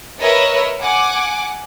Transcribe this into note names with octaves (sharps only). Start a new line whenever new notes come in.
A#4 B4 C#5 D#5 E5
F#5 G#5 D6